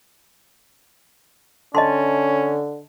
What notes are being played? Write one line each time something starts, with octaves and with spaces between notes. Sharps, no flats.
D3 C#4 D#5 A5 C6